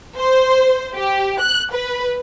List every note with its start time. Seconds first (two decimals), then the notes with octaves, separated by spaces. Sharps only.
0.18 C5
0.94 G4
1.40 F#6
1.72 B4